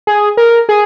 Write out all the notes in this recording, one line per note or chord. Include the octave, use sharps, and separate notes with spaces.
G#4
A#4
G#4